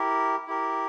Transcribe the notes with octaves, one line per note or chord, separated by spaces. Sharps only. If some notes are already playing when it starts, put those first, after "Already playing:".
Already playing: E4 G4 A#4
E4 G4 A#4